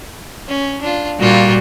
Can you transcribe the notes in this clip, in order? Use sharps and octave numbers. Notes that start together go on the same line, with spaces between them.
C#4
D4 F4
A#2 G3 A#3 F4 F#4